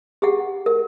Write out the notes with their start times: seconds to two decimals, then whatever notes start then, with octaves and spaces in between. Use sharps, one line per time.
0.22 G4 G#4 F#5
0.66 A#4